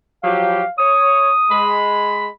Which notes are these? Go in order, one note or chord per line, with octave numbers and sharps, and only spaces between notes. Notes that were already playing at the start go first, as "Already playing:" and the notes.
F3 F#3 G4 F5
C#5 D#6
G#3 B5